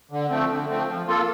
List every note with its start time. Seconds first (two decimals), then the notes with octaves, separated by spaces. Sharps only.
0.11 D3
0.30 F3 A3 C4
0.50 D3
0.69 F3 A3 C4
0.87 F3
1.06 A#3 F4 A4